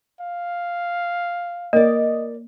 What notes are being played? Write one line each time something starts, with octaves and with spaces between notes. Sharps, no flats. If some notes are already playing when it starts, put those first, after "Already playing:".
F5
A#3 A#4 D5 D#5